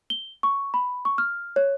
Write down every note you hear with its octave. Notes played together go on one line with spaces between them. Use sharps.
G7
C#6
B5
C#6
F6
C#5